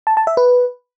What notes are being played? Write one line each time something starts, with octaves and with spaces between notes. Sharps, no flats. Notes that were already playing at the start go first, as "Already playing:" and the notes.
A5
A5
E5
B4